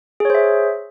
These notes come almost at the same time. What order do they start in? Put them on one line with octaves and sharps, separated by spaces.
G#4 C#5 C5 E5